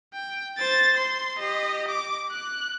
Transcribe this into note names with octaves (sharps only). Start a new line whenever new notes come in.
G5
C5 A6
C6
G4 D#5
D6
F#6